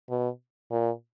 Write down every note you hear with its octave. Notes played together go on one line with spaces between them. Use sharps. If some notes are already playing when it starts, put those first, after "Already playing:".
B2
A#2